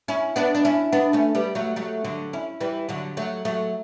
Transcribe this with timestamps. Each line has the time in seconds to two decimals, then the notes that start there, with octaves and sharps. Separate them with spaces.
0.08 C#4 E4
0.36 B3 D4
0.55 D4
0.65 C#4 E4
0.93 B3 D4
1.13 A3 C#4
1.35 G3 B3
1.55 F#3 A3
1.76 F#3 A3
2.05 D3 F#3
2.33 C#4 E4
2.61 E3 G3
2.89 D3 F#3
3.17 F#3 A3
3.45 F#3 A3